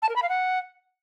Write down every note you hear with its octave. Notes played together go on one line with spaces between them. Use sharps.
A5
A#4
B5
F5
F#5